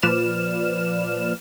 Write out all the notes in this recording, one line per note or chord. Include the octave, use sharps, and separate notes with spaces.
A#2 F3 B4 D5 F6 E7